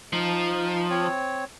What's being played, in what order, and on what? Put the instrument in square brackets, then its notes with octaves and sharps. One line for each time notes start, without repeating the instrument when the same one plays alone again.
[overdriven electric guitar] F3 [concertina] D#4
[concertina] C4 C#5